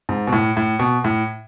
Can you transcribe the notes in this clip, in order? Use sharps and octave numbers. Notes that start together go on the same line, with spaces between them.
G#2
B2
A2
A2
B2
A2